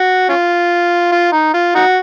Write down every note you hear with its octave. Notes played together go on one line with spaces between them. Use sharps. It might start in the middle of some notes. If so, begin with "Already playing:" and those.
Already playing: F#4
C#4 F4
F4
D#4
F4
D#4 F#4